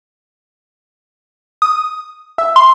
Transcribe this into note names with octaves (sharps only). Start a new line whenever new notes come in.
D#6
E5
C6